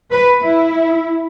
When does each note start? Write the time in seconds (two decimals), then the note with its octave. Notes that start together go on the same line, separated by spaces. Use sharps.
0.11 B4
0.43 E4